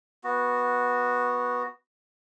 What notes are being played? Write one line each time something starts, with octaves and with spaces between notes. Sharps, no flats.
B3 F#4